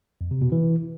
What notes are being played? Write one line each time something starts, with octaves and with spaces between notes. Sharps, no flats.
F2
C3
B2
E3